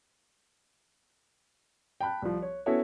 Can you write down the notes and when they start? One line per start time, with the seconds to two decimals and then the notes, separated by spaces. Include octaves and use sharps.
2.01 G5 A5 B5 F#6
2.22 C2 F3
2.42 C#5
2.66 B3 C#4 E4 F#4 A4 C#5